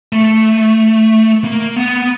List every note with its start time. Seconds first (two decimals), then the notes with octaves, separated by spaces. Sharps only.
0.13 A3
1.44 A#3
1.76 B3